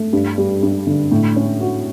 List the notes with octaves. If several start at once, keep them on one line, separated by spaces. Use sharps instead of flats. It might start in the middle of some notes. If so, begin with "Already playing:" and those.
Already playing: A3
G2
G3
G2
D3
A2
C#4
F#4